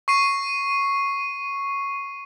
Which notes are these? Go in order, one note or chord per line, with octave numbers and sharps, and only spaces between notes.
C#6 C7 D#7